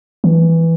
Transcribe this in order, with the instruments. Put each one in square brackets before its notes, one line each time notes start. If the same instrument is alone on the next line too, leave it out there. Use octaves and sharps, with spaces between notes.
[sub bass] E3